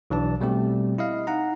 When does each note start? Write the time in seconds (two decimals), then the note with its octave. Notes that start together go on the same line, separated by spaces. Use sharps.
0.10 B1 E3 D4 D5 A5
0.41 B2 G3 A3 C4 G4
0.98 E4 D#5 F5
1.27 D#4 F#5 A#5